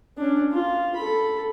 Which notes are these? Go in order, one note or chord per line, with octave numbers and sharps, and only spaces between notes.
C#4 D4
F4
A4 B5